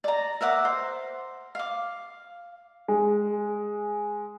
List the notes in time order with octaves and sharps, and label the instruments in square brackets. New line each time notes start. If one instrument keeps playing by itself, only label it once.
[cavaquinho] D5 A#5
A#4 E5 F#5 D6
C5
F5 D6
[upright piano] G#3